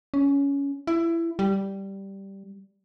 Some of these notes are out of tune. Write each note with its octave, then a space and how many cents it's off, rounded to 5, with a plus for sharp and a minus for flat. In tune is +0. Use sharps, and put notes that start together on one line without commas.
C#4 +15
E4 +20
G3 -5